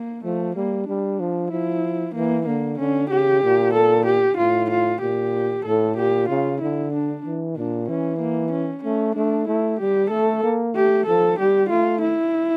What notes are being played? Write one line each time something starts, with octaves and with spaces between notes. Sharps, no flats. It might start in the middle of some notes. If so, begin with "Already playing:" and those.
Already playing: A#3
F3 A3
G3 A#3
G3 D4
F3
F3 E4
E3 A#3
D3 A#3
D3 C#4
C#3 G4
A#2
A4
G4
A2 F4
F4
A#2 G4
A2 A4
A#2 G4
C#3 F4
D3 E4
D4
E3
A#2 D4
E3 C#4
A#3
C#4
A3 C#4
A3 D4
A3 E4
G3 G4
A3 A4
A#3
A3 G4
F3 A4
G3 G4
A3 F4
E4